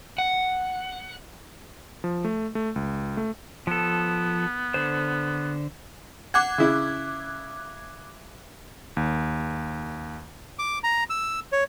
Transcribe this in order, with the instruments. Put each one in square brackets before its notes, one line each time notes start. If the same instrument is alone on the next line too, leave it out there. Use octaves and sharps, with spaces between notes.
[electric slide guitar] F#5
[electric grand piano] F3
A3
A3
C#2
A3
[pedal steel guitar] F3 A4 [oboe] B3
[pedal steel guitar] D3 C5
[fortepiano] F#5 [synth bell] D6 F#6 G#6
[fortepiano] C#3 E4
[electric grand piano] D#2
[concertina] D6
A#5
E6
C#5